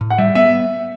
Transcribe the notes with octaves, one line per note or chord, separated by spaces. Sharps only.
A2
F#5
G3 E5
B3 E5